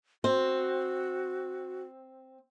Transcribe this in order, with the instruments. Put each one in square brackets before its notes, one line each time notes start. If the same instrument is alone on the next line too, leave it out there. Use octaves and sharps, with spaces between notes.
[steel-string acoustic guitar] C4 [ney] F#4